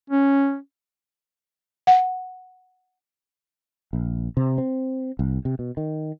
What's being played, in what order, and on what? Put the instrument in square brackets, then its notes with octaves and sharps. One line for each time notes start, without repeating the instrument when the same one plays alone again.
[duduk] C#4
[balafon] F#5
[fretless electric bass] A#1
C3
C4
C2
C3
B2
D#3